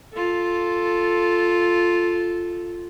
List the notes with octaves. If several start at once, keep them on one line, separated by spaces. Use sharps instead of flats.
F4 A4